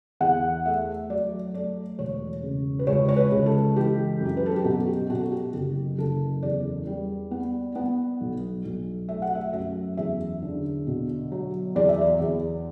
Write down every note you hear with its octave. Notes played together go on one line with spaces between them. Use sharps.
E2 F#5
A3 E5
F#3 D5
A3 D5
E1 C#5
C#3
B4
C#2 C#5
C#5
B4
C#2
A4
E3 G4
F#2
B4
A4
G4
B2 F#4
G4
B2 F#4
A4
G4
F#1 G4
F#1 A4
E2 D5
G3
B3
B3
B1
B1
A3 E5
F#5
E5
F#2 E5
E2 E5
D3
B2
F#3
E2 D5
E5
D5
E2